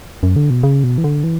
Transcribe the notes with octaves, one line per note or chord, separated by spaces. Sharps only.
F#2
D3
B2
C#3
B2
E3
D3
E3